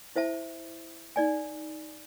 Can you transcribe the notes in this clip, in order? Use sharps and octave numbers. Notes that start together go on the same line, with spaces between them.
E4 C5 E5 A5
D#4 D5 G#5